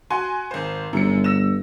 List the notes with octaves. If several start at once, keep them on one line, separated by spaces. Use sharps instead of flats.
F#4 G#5 C6
G#1 C5
G1 F#2 C#7
E6 A#6 E7